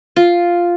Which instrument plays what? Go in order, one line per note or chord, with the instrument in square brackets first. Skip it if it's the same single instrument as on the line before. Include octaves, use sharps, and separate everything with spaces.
[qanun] F4